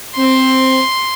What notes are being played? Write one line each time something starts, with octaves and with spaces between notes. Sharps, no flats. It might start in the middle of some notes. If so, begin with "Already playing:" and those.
C4 C6